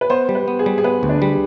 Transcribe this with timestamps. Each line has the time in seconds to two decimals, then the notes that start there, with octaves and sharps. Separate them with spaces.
0.01 B4
0.10 B3 C5
0.29 G3
0.35 B4
0.48 B3
0.59 G#4
0.66 G3
0.78 G#4
0.84 B3 B4
1.03 D2
1.09 D4
1.22 G3